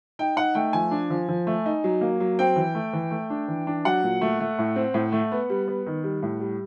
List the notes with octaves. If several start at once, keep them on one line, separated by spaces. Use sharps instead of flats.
D#4 G5
D#4 F#5
A3 G5
F3 G#5
D4
F3
F3
A3
D#4
F#3
A#3
F#3
C4 G5
E3
A3
E3
A3
D4
E3
D4
F#3 F#5
A#2
A3
A3
A2
C4
A2
A3
B3
G3
B3
D#3
G3
A2
G3